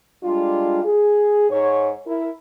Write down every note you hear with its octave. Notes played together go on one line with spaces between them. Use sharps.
G3 G#3 D4 F4
G#4
G#2 C#5
E4 A#4